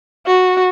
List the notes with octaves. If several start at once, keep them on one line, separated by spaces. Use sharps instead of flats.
F#4